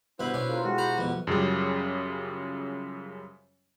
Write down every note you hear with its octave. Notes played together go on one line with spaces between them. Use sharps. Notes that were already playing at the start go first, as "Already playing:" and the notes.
G2 B2 E4 B4 C5 B5
B2 C#4 D4
F4 A4 A#4
G#3 E4 F#4 G4
C5 A#5 B5
F2 B2
F#2 C#3 F3 G3